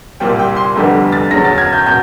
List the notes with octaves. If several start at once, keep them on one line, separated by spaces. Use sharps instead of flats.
C2 A#2 G3 C4 G5
G5
C6
F1 F2 D3 G3 B3
A6
E2 C#3 F#3 A#6
A6
G#6
G6
B2 G6